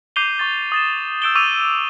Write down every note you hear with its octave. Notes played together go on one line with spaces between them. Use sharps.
D6 G6 C7 D#7 F7 G7
C#6 D6 A6
D#6 A6 E7
E6 G6 D7 E7 G7
C#6 D6 E6 D#7 F7